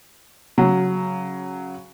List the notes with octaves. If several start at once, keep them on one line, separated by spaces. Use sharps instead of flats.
C#3 F#3